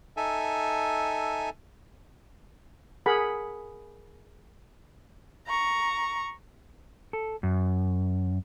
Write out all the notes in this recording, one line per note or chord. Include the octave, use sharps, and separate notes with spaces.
D#4 A4 E5 G#5
G#4 A#4 F#5 B5
A#5 C#6
A4
F#2